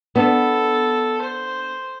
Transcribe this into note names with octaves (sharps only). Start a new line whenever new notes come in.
B3 D4 A4
C5